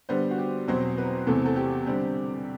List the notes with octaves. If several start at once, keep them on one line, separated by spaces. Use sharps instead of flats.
D3 G3 B3 C5
F#4
G4
E2 B2 F#3 C4 C5
B4
E2 C3 E3 A3 C4 A4
A4
G4
D3 G3 C4